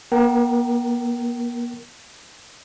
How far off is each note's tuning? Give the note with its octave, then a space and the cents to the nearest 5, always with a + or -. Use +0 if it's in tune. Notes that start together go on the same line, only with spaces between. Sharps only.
A#3 +45 A#4 +0 G5 -35